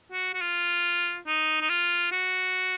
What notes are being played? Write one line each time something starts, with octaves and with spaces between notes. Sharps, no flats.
F#4
F#4
F4
D#4
D#4
F4
F#4